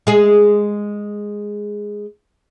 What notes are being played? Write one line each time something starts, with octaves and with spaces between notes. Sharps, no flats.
G#3 G#4